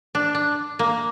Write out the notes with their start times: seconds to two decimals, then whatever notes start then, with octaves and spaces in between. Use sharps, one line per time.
0.15 D4
0.35 D4
0.79 A#3